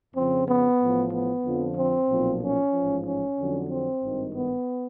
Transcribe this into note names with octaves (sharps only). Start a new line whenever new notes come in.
F2 C#3 F3 C4
B3
A1 A2 F3
B3
F2 D3 F3
C4
B1 A#2 F3
C#4
A1 G#2 F3
C#4
F2 D3 F#3
C4
G#1 G2 D#3
B3